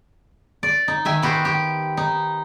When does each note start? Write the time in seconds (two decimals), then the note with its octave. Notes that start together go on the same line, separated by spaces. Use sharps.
0.63 D5
0.88 D#4
1.05 D#3 E5 G#5
1.22 B3 F#4 G4 C5
1.45 G4
1.97 D#4